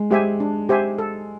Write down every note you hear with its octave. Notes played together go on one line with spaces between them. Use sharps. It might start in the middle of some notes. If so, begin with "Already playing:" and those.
Already playing: G#3
G#3 G4 C5 E5 G#5
D4
G4 C5 E5 G#5
A4